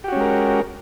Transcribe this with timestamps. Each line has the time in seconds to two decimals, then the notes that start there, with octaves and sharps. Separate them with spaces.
0.04 G4
0.08 F#4
0.12 C#4
0.16 G#3
0.21 A#4